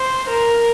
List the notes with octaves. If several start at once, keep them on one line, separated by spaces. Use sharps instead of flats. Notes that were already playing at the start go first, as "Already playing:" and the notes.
Already playing: C5
A#4